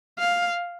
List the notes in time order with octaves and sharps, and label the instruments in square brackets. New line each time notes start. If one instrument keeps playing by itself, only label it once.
[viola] F5